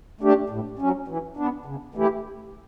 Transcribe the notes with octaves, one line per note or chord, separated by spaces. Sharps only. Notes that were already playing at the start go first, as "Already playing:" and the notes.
A3 D4 G4
A2
F#3 C#4
E3
B3 D4
C#3
E3 A3 E4 G4